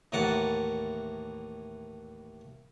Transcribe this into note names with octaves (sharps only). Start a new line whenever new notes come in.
D#2 A2 E3 A#4 F#5 A5